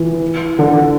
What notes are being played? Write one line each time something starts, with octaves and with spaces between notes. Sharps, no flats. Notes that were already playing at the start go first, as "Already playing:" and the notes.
Already playing: E3
D3